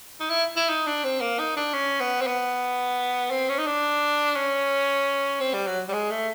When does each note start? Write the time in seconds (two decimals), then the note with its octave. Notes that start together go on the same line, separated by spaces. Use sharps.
0.20 D#4
0.30 E4
0.56 E4
0.69 D#4
0.87 D4
1.04 C4
1.21 A#3
1.39 D#4
1.57 D4
1.74 C#4
2.00 B3
2.21 C4
2.27 B3
3.31 C4
3.49 C#4
3.59 D#4
3.66 D4
4.36 C#4
5.40 C4
5.54 G3
5.67 F#3
5.89 G3
5.93 G#3
6.11 A3